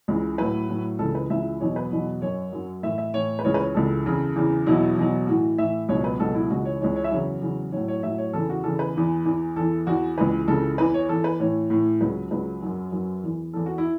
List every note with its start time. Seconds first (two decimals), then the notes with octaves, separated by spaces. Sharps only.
0.08 C#2 C#3 E3
0.38 A2 F#3 B4
0.69 A2 F#3
0.99 C#2 C#3 E3 A4
1.15 B4
1.30 C#2 C#3 E3 E5
1.60 E2 B2 F#3 C#5
1.76 B4
1.91 E2 B2 F#3
2.22 F#2 F#3 C#5
2.53 F#2 F#3
2.83 A2 E3 E5
2.98 E5
3.14 A2 E3 C#5
3.39 B4
3.44 C#2 C#3 E3 C#5
3.54 B4
3.60 C#5
3.74 C#2 C#3 E3 A4
4.05 E2 C#3 E3
4.36 E2 C#3 E3
4.67 E2 B2 F#3 E4
4.97 E2 B2 F#3
5.27 A2 E3 F#4
5.58 A2 E3 E5
5.89 C#2 B2 F#3 C#5
6.04 B4
6.19 C#2 B2 F#3 A4
6.35 E4
6.50 C#2 C#3 E3 F#4
6.65 C#5
6.80 C#2 C#3 E3 C#5
6.96 C#5
7.04 E5
7.11 E2 C#3 F#3 C#5
7.42 E2 C#3 F#3
7.72 A2 F#3 C#5
7.88 C#5
8.03 A2 F#3 E5
8.18 C#5
8.33 E2 C#3 E3 A4
8.49 F#4
8.64 E2 C#3 E3 A4
8.79 B4
8.95 E2 E3
9.25 E2 E3
9.56 E2 E3 A4
9.87 E2 E3 F#4
10.18 C#2 C#3 E3 B4
10.48 C#2 C#3 E3 A4
10.78 E2 E3 B4
10.94 C#5
11.09 E2 E3 A4
11.24 B4
11.40 A2 E3 C#5
11.70 A2 E3
12.01 C#2 C#3 F#3 B4
12.31 C#2 C#3 F#3 B4
12.62 F#2 F#3
12.92 F#2 F#3
13.23 E2 E3
13.53 E2 E3 A4
13.66 F#4
13.78 E4